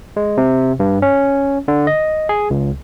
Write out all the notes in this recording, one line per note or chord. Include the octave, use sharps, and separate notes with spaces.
G#3
C3
G2
C#4
D3
D#5
G#4
C#2